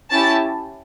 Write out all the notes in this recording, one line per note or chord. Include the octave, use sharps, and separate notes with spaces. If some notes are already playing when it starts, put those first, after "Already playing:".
C#4 E4 G4 A5